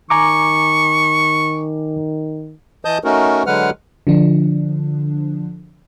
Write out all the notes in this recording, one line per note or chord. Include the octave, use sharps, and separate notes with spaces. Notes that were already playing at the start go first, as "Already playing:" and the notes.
D#3 G#5 A#5 C#6 D6
E3 D#5 A5 D#6 G6
A3 C#4 D#4 F#4 A#4
D3 F#3 G#3 B4 F#5 F6
D3 F3 D4